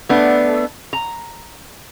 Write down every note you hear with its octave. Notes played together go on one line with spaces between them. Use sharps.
A3 B3 D4
A#5